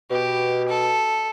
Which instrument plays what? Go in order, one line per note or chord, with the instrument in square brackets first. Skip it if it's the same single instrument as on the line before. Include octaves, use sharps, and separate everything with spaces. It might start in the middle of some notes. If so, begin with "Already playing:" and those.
[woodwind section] B2 [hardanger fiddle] G4
[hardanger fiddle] A4